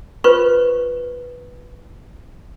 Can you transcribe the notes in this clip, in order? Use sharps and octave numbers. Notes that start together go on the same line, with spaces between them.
F4 B4 C5 C#6